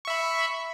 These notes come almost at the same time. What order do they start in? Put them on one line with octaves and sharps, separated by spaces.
C#6 E5 B5